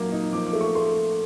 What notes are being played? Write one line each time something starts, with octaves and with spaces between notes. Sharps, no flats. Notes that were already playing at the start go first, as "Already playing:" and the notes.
Already playing: F#3 A#3 D#4 D6
D#4
F3 D6
D6
A3
C#6
A3 C6